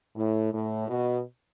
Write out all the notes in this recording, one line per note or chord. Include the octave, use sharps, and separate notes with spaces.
A2
A2
B2